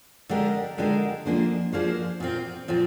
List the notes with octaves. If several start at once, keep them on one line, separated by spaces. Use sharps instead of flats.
D3 G#3 D4 G4 A#4
D3 G#3 D4 G4 A#4
F3 A#3 D4 G#4 C5
F3 A#3 D4 G#4 C5
A#2 F3 C4
A#2 F3 C4